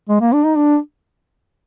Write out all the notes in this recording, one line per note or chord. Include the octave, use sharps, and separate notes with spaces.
G#3
A#3
D4
D#4
D4